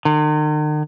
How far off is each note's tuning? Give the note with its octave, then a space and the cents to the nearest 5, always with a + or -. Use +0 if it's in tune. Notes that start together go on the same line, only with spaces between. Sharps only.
D#3 -45